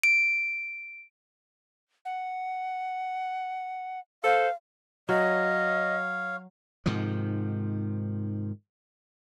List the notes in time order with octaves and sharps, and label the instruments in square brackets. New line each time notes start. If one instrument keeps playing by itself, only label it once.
[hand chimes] D7
[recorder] F#5
[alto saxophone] A4 [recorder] C5 [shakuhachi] F5
[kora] F#3 [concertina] C#5 F5 [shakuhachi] D#5
[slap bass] G#2 C3 D#3 F3